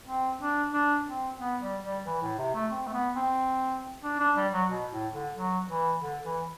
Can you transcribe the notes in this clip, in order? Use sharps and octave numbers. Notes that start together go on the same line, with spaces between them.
C4
D4
D4
C4
B3
G3
G3
E3
A2
C3
A3
C4
A3
B3
C4
D4
D4
G3
F#3
B2
A2
D3
F#3
E3
D3
E3